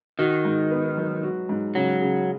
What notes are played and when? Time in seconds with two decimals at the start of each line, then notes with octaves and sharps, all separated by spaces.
0.19 D#3 F#4
0.45 G#2
0.71 B3
0.97 F#3
1.23 F#4
1.49 G#2
1.75 C#3 F#3
2.02 C#3